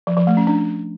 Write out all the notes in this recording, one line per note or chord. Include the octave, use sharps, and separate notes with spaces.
F3
F3
A3
C#4
D4